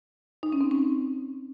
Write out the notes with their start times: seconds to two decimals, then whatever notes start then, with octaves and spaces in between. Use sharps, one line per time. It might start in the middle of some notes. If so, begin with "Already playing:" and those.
0.43 D#4
0.52 C#4
0.61 C4
0.71 C#4